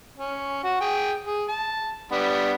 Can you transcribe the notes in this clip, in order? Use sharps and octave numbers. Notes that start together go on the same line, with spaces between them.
C#4
F#4
G#4 G5
G#4
A5
G3 B3 D4